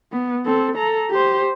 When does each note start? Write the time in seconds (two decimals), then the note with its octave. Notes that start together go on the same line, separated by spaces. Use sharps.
0.12 B3
0.45 C4 A4
0.76 A4 A#5
1.10 G4 C5